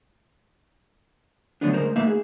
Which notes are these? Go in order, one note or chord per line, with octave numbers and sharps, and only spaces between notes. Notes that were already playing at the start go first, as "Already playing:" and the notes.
D3 E3 F#3 A3 B3 D4
D2 C#3 G#3 A#4 C5
A3 A#3 D#4 B4 E5 F5
G#4